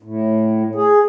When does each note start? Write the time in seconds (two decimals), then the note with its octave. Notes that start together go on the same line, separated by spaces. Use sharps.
0.03 A2
0.75 G#4